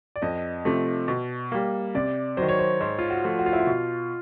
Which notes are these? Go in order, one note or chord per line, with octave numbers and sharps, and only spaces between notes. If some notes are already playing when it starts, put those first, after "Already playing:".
D5
F2 D#5
C3 F3 A3
B2
G3 A#3
C3 D5
D#3 F#3 C5
C#5
C5
G#2 C5
F4
F#4
F3 A3
F#4
F4
E4
F4
B2